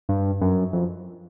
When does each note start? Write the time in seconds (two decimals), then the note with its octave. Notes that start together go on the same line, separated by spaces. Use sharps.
0.09 G2
0.41 F#2
0.73 F2